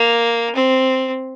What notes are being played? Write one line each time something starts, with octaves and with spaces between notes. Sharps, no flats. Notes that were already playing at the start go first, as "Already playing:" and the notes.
Already playing: A#3
C4